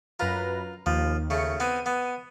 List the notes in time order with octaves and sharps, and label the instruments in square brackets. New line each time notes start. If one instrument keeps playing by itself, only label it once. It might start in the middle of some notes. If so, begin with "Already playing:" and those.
[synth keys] F#2 B4 A#5 [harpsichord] F4
[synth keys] D#2 [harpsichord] F3
[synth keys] D#2 C#7 [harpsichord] C#3 A3
[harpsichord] B3 C4 [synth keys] D#7
[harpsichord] B3